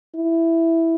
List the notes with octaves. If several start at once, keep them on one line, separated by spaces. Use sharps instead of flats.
E4